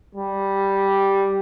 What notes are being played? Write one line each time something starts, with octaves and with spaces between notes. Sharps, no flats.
G3